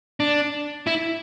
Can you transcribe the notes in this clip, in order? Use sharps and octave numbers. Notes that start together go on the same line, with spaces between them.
D4
E4